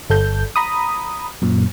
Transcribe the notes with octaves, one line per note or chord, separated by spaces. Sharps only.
G1 A4 G6
A#5 B5 D#6
F#2 A#2